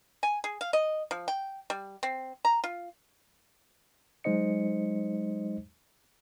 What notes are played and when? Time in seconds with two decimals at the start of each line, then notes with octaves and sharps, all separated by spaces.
0.23 G#5
0.44 G#4
0.61 F5
0.73 D#5
1.11 F3
1.28 G5
1.70 G3
2.03 C4
2.45 A#5
2.64 F4
4.24 F#3 G#3 D#4 C5 D#5 C#7